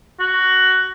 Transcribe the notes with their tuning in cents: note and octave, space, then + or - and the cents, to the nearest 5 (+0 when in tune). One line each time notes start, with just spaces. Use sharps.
F#4 +10